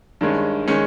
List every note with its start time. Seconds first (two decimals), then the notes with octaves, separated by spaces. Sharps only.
0.21 G2 D#3 G#3 C#4
0.68 D#3 G#3 C#4